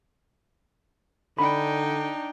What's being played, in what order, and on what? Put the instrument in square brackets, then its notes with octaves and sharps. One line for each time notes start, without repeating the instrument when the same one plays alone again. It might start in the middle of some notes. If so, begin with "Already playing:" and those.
[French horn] D3 [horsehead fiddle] D4 G5 [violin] D#4 [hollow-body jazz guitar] B5